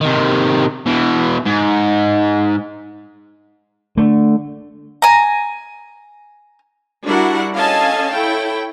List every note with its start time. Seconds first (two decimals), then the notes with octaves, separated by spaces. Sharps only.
0.01 C3 D#3
0.86 B2 E3
1.46 G#2
3.98 D3 A3
5.02 G#5 A#5
7.05 G3 D4 E4 F#4 A#4 F#5
7.54 C#4 A4 D#5 F5 G#5 A5
8.11 E4 A4 C#5 G5